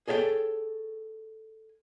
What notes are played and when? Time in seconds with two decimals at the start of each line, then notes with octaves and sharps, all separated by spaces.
0.08 G#4 A4 C#5 E5 G5